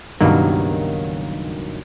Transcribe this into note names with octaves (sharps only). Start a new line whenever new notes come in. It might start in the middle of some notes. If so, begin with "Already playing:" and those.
C#2 G2 B2 D#3 F#3 A#3